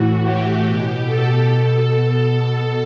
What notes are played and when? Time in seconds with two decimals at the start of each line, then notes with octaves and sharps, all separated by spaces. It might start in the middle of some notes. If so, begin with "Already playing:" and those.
Already playing: A2 E3 F#4
0.23 G4
0.65 B2
1.05 A4
1.45 B2 A4